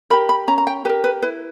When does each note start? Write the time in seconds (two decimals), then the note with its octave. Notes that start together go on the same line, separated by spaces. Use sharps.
0.10 G4 A#4 B5
0.29 B5
0.48 C#4 A#5
0.58 A#5
0.67 G5
0.85 G4 B4
0.89 A#4
1.04 B4
1.22 E4 B4